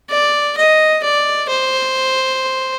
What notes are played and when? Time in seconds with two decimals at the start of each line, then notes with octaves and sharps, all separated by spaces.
0.10 D5
0.57 D#5
1.04 D5
1.50 C5